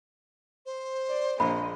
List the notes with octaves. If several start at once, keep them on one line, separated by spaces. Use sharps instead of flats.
C5
D5
A#1 G#3 B5